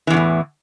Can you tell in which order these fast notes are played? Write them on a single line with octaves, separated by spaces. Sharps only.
E3 E2 C#3 A2